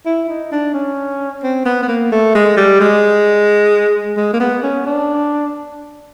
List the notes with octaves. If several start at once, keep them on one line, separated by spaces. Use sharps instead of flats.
E4
D#4
D4
C#4
C4
B3
B3
A#3
A3
G#3
G3
G#3
G#3
A#3
B3
C#4
D4